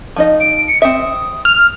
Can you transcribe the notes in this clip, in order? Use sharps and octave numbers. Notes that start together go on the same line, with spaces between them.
F3 D#4 D#5
D7
C#7
C4 E5 D#6
F6